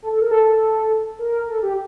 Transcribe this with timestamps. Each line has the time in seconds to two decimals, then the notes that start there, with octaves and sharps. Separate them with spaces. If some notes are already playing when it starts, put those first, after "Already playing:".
0.02 A4
0.13 A4
0.22 A#4
0.31 A4
1.19 A#4
1.48 A4
1.63 G4